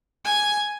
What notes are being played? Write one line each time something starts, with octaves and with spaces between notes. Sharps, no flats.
G#5